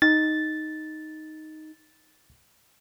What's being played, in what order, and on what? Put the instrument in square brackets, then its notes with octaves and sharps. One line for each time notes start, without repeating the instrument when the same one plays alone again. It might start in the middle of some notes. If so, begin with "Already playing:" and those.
[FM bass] D#4 [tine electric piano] A6